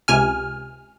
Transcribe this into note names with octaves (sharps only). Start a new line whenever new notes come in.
C#2 C3 G#5 F6